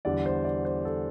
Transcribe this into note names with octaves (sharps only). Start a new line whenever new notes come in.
E2 D3 G3 D5
C5
D5
C5
A4